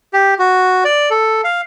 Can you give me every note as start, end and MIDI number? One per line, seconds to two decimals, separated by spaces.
0.13 0.34 67
0.39 0.84 66
0.85 1.10 74
1.10 1.41 69
1.44 1.61 77